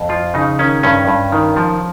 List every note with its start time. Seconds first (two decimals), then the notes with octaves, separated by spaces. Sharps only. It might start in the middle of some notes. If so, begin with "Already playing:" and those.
Already playing: F2
0.09 F3 F4
0.34 C#3 D#4
0.59 D#3 C#4
0.83 G2 C#4
1.08 G2
1.32 D#3
1.56 F3